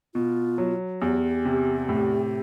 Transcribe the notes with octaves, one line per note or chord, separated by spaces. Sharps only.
B2 F4
F#3
E2 G4
C3
A2